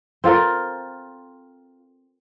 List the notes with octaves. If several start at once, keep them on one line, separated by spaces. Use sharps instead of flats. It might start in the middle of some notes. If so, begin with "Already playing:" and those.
C4 F4 A4 A#4